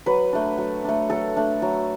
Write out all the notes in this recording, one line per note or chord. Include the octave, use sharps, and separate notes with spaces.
F#3 B4
A3 D4
F#3
A3 D4
F#3 A4
A3 D4
F#3